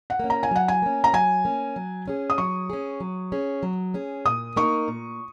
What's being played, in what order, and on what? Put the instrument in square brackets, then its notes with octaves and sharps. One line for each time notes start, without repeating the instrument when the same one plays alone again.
[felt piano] F#5
[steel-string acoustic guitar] A#3 C#4
[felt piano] A#5
G#5
[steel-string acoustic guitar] F#3 [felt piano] F#5
[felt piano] G#5
[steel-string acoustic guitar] A#3 C#4
[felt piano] A#5
[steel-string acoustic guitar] F#3 [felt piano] G#5
[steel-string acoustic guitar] A#3 C#4
F#3
C#4 G#4
[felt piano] D#6
[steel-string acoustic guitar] F#3 [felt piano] C#6
[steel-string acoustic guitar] C#4 G#4
F#3
C#4 G#4
F#3
C#4 G#4
[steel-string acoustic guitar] A#2 [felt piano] D#6
[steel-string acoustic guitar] A#3 D#4 A#4 [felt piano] C#6
[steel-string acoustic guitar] A#2